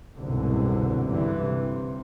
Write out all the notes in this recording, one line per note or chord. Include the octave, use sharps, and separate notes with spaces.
F#1 C2 G#2 B2 D3
G2 D3 E3
C3